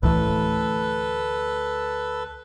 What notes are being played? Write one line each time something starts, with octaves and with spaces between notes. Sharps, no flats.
D2 A2 E3 A3 A4 B4